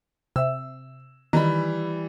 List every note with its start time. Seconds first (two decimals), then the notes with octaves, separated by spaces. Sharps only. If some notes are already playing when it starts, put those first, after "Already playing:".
0.36 C3 E5 E6
1.33 D#3 E3 G3 B5